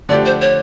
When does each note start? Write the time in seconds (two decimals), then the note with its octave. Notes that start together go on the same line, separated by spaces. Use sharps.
0.09 D3 F3 A3 D4 G4 D5
0.26 C5
0.42 C#5